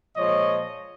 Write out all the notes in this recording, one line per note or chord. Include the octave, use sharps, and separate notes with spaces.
A#2 F3 G#3 C#5 D#5